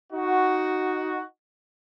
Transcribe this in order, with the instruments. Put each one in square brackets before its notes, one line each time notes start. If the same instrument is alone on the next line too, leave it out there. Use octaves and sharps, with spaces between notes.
[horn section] D#4 F#4